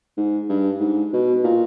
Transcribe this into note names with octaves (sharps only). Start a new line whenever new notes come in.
G#2
G2
G#2
B2
A#2